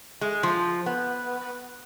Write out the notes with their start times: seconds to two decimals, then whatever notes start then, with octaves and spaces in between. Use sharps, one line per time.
0.21 G#3
0.43 F3
0.86 B3